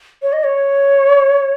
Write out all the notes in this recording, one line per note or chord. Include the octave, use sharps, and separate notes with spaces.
C#5
D#5
C#5